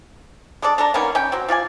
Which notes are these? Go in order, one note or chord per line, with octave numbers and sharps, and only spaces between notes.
G#3 D4 A4 D5
D4 A4 A5 A#5
D#3 A#3 B3 C#4
C#4 G5
F#3 C4
F3 F4 D5 G#5